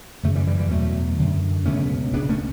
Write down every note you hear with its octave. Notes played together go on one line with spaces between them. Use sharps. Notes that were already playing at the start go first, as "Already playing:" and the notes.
F#2 C#3 F#3 A3
E3 G3
E3 G3
E3 G3
E2 B2 F#3 A3
F#2 D3
C#2 B2 A3 C#4
C#2 C#3 B3 D4
A3 C#4